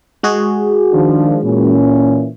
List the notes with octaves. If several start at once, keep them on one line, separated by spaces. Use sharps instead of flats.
G#3 F#4 G#4
D#3 F3 D4
A#2 E3 C#4